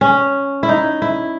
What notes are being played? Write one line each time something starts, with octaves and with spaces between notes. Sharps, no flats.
C#4
E4
D#4
E4